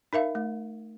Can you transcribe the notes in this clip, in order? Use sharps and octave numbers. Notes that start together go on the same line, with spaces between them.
D#4 A#4 E5 F5
A3